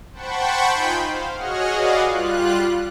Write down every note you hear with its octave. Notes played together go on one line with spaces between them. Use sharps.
C5 F#5 G5 A5 B5 C#6
D#4 F4 G5 G#5 B5 C6
C5 F5
F#4 G#4 C#5 D#5 F#5 F6
F#4 G#4 B4 D5 D#5 F5
G3 F4 F#6